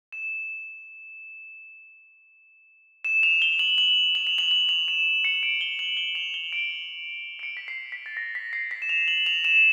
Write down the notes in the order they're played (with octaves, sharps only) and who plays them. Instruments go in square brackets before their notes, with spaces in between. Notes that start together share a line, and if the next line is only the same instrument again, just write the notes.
[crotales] E7
E7
F7
G7
F#7
F#7
F#7
F7
F#7
F#7
F7
E7
C#7
D7
G7
F#7
G7
F7
G7
D7
D7
C#7
B6
C7
B6
A6
A#6
B6
C7
B6
E7
F7
F#7
F7
E7